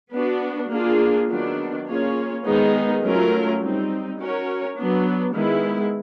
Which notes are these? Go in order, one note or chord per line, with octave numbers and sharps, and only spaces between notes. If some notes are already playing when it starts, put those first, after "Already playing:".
B3 D4 F#4
A#3 D4 F4 G#4
D#3 F#3 B3 D4
A#3 C#4 F4 G#4 C#5
D#3 G#3 B3 D#4 G#4
F#3 A3 C#4 F4 A#4
G3 C4 D#4
C#4 F#4 A#4 C#5
F#3 B3 D4
D#3 G#3 B3 E4